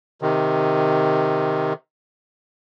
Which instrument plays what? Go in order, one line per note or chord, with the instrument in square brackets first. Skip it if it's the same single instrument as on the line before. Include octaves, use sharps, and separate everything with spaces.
[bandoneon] C3 D#3